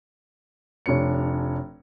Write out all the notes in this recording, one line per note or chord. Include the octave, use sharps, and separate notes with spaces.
F1 D4 C#5 C#7